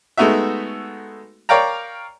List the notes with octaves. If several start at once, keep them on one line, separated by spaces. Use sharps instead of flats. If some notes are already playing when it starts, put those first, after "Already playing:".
G#3 A3 B3 D#4 F#4 E5
A#4 C#5 D5 F5 G5 A#5